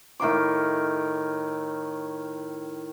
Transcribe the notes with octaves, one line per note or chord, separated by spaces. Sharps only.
A2 D#3 F5 D6